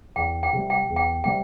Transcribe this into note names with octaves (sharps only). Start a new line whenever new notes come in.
E2 G5
G5
C3 G3
G5
E2
G5
C3 G3 G5